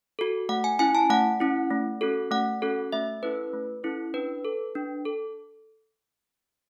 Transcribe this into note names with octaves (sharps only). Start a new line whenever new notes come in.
F#4 A4
A3 F#5
G#5
C#4 E4 G#5
A5
A3 F#5
C#4 E4
A3
C#4 F#4 A4
A3 F#5
C#4 F#4 A4
A3 E5
C#4 E4 A4 B4
A3
C#4 E4 A4
D4 B4
A4
D4
A4